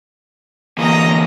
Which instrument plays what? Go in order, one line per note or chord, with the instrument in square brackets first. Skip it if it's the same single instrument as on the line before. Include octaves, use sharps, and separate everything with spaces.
[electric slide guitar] D3 E3 A#3 [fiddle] D#5 A#5